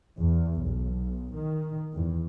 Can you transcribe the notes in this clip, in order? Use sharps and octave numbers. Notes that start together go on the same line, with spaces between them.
E2
B1
D#3
E2